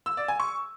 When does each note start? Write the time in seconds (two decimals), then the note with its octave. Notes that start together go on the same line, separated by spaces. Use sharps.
0.06 E6
0.17 D5
0.28 G#5
0.40 C#6